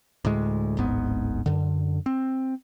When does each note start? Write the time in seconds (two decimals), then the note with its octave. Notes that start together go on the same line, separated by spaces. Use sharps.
0.25 D2 A2 G#3
0.77 D1 G#1 G#2 B3
1.46 F#2 D3
2.06 C4